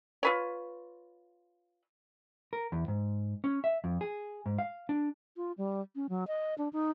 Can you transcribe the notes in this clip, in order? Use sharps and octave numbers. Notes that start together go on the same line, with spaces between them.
F4 B4 C#5
A#4
E2
G#2
C#4
E5
F2
G#4
G#2
F5
D4
F4
G3
C#4
F#3
D#5
D4
D#4